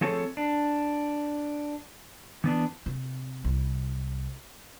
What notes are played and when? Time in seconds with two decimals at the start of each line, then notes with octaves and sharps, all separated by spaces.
0.01 F3 A3 C4 G#4 A4 C#5
0.37 D4
2.44 E3 B3 D4
2.86 C3
3.44 C2